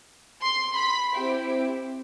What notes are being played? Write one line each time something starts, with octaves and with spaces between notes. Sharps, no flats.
C6
B5
C4 E4 G4